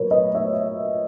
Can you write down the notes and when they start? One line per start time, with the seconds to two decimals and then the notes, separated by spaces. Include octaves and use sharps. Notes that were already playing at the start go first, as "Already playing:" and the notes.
Already playing: A#2 F#3 A#4 B4 C#5
0.11 B4 D#5
0.35 C#5 E5